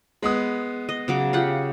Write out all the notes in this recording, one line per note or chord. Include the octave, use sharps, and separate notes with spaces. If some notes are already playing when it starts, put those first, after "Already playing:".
G#3 B3 D#6
D#5
C#3 F#3 D6
F4 G4 F#5